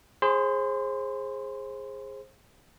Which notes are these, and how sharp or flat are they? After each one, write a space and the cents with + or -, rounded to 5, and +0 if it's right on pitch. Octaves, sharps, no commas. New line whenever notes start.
G#4 -5 C5 +30 C6 -35